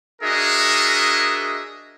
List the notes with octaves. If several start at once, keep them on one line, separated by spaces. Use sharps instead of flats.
D4 F#4 G#4 A#4 D#5 E5